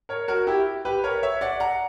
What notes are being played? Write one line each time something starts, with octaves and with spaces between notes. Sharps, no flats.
A#4 C#5
F#4 A#4
E4 G4
G4 B4
A#4 C#5
C#5 E5
D5 F#5
F#5 A#5